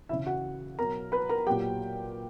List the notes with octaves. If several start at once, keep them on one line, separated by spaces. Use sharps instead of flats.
C#3 E3 E4 E5
F#4 F#5
B2 F#3 A#4 A#5
B4 B5
A#4 A#5
A#2 F#3 G4 G5